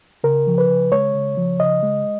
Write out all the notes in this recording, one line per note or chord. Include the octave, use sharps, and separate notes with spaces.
C#3 A#4
F3
B4
C#3
G#3 C#5
C#3
F3
C#3 D#5
G#3